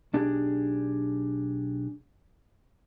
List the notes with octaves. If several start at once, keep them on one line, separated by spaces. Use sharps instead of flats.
B1 D4 G4 G#4